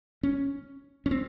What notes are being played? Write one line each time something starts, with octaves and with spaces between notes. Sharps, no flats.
C#4
C#4
C4